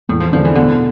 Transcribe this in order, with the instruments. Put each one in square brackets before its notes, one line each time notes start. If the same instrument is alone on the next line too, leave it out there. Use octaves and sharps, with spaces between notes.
[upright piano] E2 [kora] A2
[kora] F3
[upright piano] D3 G#3 D4 [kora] F3
[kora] E3
[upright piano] B2 [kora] D3